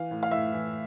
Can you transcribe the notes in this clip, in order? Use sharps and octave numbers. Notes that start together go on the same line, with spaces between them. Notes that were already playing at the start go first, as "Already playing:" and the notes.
Already playing: E3 F5
A2
F5
A2 E5
E3